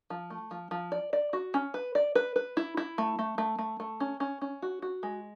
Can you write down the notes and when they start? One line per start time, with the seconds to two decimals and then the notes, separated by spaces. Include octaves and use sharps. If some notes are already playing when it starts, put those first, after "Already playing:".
0.10 F3
0.30 A3
0.51 F3
0.71 F3
0.92 D5
1.13 D5
1.33 F#4
1.54 C#4
1.74 B4
1.95 D5
2.15 B4
2.36 B4
2.57 E4
2.77 E4
2.98 A3
3.19 A3
3.38 A3
3.59 A3
3.80 A3
4.00 C#4
4.20 C#4
4.41 C#4
4.62 F#4
4.82 F#4
5.03 G#3